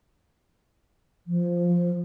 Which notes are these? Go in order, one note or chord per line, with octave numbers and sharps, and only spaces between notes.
F3